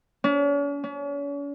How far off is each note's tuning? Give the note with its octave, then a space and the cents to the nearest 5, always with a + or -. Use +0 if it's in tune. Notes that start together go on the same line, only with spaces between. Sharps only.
C#4 +45
C#4 +40